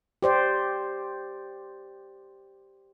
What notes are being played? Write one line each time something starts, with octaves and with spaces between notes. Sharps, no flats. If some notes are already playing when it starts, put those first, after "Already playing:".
G4 C5 D5